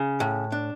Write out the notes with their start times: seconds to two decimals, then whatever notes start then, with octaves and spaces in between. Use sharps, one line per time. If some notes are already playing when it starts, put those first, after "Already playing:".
Already playing: C#3
0.20 A2
0.52 D4